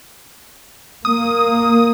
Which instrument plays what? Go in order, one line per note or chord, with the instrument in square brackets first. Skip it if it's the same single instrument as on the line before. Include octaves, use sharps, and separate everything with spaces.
[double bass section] A#3 [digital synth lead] D#6